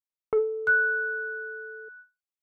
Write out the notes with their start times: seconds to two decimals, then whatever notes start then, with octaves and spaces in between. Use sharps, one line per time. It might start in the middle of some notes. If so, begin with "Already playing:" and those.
0.33 A4
0.67 F#6